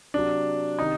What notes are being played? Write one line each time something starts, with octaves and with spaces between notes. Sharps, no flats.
C3 F#3 D4
C3 D#3 D#4